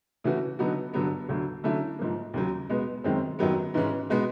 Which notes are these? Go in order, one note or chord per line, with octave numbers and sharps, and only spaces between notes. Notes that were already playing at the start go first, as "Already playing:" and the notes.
C#3 E3 A3 C#4 F#4
D3 F#3 B3 D#4 F#4
G2 D3 F#3 B3
D2 D3 F#3
D3 F#3 A3 C#4 E4
G#2 F3 A#3
D#2 C#3 F#3
B2 G#3 B3
F#2 D#3 G#3 C4
F#2 D#3 F#3 B3
G#2 E3 G#3 C#4
B2 G#3 B3